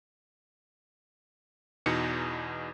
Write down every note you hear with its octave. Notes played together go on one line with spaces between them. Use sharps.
E2 B2 D#4 C#7